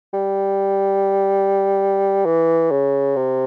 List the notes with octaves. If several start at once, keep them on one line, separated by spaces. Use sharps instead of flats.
G3
E3
C#3
C3